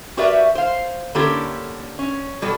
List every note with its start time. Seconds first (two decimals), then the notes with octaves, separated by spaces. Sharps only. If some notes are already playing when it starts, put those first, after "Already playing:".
0.17 F#4 G4 A#4 B4 D5 E5
0.55 C5 F5
1.15 D3 A#3 C#4 E4 G4 A4
1.99 C#4
2.42 B2 G3 F#4 A4